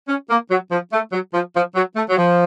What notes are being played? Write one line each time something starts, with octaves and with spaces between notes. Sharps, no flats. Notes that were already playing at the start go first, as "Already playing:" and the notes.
C#4
A#3
F#3
F3
A3
F#3
F3
F3
F#3
A3
F#3
F3